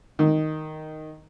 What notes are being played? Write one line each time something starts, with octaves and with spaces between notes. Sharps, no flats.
D#3